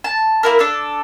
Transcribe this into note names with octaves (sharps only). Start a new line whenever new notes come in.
A5
A#3 E4 A#4
D4 A4